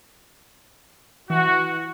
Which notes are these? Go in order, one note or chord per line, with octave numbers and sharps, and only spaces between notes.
E3 F#4